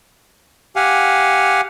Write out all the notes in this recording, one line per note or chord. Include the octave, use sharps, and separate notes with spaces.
G4 F5 F#5 G#5